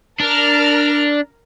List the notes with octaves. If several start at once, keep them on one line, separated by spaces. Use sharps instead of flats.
D4 A#4 F6